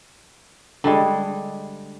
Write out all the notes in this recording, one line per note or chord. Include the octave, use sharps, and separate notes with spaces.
D3 G3 G#3